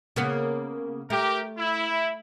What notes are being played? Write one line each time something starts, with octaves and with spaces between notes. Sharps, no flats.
C#3 A#3 B3
A3 G4 A#4
E4